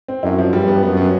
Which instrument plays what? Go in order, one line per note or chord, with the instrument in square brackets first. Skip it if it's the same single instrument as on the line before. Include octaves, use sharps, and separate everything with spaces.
[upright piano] C4
[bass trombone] F#2 [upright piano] E4
[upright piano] F3
[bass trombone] G2 [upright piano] G3
[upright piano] B3
[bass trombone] F#2 [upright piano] B3
[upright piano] B3